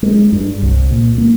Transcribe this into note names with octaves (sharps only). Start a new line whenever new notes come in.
G#3
G2
C2
A#2
A#3